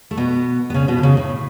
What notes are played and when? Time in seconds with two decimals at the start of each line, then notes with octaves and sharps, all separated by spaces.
0.11 A3
0.17 B2 B3
0.70 B3
0.74 C#3 C#4
0.88 B2 B3
0.98 D3
1.03 C#3
1.17 A2